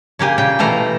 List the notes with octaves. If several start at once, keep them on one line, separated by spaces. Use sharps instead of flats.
C#3 A#3 G4 G#5
A#2 C#3 G5
B2 E3 A3 F5 A#5